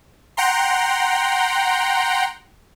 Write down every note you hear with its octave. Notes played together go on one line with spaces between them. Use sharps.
F#5 G5 A#5 C6